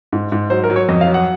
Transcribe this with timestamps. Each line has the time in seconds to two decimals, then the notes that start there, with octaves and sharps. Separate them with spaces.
0.13 G#2
0.32 G#2
0.50 F#3 C5
0.64 A#4
0.70 F#3
0.76 C#5
0.89 F2 D#5
1.01 F5
1.07 F#3
1.14 F#5